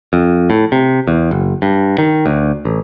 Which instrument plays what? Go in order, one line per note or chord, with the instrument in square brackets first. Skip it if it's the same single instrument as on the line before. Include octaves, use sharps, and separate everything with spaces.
[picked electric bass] F2
A2
C3
E2
F#1
G2
D#3
D2
A1